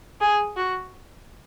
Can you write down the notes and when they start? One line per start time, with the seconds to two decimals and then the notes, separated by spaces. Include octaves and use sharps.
0.21 G#4
0.57 F#4